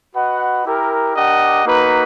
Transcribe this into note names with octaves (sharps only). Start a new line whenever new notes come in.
F#4 B4 D#5 F#5
E4 G4 A#4
D4 G4 A#4 D#5 F#5
A#3 D#4 F#4 B4